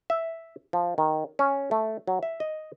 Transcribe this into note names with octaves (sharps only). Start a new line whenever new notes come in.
E5
F3
D#3
C#4
A3
F#3
E5
D#5